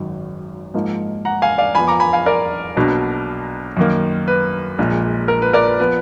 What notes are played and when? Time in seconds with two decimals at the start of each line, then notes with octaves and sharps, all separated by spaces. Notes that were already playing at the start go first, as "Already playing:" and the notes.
Already playing: G#1 F#2 D#3 F#3
0.74 G#2 F3 A#3 D#4
1.25 F#5 A#5
1.42 F5 G#5
1.58 D5 F5
1.75 F2 F3 B3 G#5 B5
1.88 A#5 D6
2.00 G#5 B5
2.13 F5 G#5
2.26 A#4 D5
2.76 B1 B2 F#3 A#3 D4
3.77 F#2 D#3 A#3
4.28 B4
4.78 A#1 A#2 G#3
5.28 A#4
5.42 B4
5.53 A#4 D5
5.67 B4
5.79 F3 B3 B4